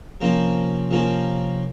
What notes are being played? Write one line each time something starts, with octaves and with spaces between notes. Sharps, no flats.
C3 F3 A#3 C#4 F4
C3 F3 A#3 C#4 F4